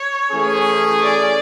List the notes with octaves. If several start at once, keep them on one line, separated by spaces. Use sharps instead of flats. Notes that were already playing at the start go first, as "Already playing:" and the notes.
Already playing: C#5
E3 A3 C#4 G#4
D5